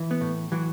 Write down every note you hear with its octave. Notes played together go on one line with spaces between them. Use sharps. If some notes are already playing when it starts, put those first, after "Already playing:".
Already playing: E3
B3
A2
E3 F#3